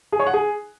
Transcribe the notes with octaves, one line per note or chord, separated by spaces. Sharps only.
G#4
C#5
F#5
G#4